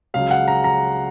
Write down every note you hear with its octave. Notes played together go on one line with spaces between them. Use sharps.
C#2 C#3 F#3 F5
F#5
A#5
A#5